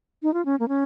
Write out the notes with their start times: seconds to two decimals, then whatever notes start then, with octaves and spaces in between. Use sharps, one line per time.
0.23 D#4
0.34 F4
0.45 C#4
0.60 A#3
0.68 C#4